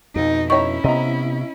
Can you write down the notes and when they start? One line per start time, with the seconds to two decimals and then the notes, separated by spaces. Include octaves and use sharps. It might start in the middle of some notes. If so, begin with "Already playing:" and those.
0.16 F2 B2 D#4
0.50 C#4 D#4 E4 C#5 A#5 C#6
0.84 C3 B3 D#5 A#5